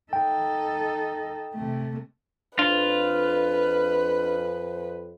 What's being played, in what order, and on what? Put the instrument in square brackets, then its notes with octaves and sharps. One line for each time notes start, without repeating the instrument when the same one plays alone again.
[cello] D#4 A4 [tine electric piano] G5
[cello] C3 A3
[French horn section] F2 C5 [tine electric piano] D4 [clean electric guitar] F4 [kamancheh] B4